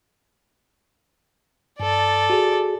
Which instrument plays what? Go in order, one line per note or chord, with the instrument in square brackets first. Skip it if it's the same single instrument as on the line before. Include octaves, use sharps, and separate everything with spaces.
[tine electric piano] G2 [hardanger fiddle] A4 D5
[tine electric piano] F#4 G#4